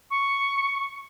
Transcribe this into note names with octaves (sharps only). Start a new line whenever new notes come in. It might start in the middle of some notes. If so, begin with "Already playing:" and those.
C#6